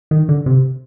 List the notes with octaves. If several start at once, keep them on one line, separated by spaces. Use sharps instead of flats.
D#3
D3
C3